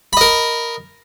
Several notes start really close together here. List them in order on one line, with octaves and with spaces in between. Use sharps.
B5 D#5 A#4